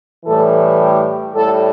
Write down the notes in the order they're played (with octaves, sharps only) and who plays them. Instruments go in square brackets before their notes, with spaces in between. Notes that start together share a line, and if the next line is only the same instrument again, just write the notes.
[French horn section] A2 E3 G3 A4
G4
A2 G3 A4